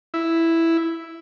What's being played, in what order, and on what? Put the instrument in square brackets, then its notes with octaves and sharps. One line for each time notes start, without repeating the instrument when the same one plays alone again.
[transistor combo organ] E4